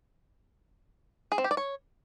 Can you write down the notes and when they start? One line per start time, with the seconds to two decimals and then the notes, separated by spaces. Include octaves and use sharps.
1.32 G#4
1.38 C4
1.44 G4
1.51 D5
1.57 C#5